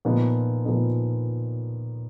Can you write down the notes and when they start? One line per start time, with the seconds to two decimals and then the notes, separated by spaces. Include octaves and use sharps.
0.05 A#2 F3 B3 D#4
0.65 A#2 F3 B3 D#4